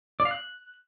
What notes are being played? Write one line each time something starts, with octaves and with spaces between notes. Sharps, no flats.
D5
F5
F#6